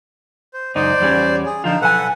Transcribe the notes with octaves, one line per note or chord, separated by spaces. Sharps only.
C5
C#2 F#2 D#4 C5 D5
E2 G3 C#4
G#4
D3 F3 D#4 F4
B1 A4 B4 F#5 G#5